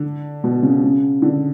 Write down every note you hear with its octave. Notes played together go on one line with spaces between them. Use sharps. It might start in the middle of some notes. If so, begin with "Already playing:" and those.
Already playing: D3
B2
C#3
C#3
D3